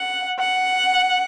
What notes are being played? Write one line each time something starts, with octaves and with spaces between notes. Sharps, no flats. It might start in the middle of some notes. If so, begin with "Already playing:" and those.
Already playing: F#5
F#5